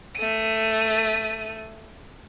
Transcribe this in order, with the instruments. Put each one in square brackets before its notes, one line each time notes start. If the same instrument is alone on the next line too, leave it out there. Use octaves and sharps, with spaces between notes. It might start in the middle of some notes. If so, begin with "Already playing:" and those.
[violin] A3 D#7